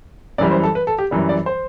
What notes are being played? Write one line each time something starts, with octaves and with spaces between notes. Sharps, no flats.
F#2 E3 G3 D5
C5
A4
B4
A4
G4
F#2 E3 G3
D5
C5